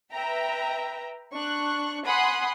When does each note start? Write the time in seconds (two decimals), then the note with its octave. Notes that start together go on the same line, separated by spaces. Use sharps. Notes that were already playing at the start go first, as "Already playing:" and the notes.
0.13 B4 E5 G5 A#5
1.35 D4 C#6 F#6
2.07 F#5 G#5 B5 C6 D#6 F#6